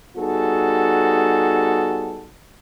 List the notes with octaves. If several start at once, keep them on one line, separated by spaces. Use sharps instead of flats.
G3 B3 D#4 F#4 G#4 A4